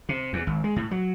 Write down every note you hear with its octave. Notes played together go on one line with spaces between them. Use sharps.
C3
E2
G#1
G#3
A2
F#3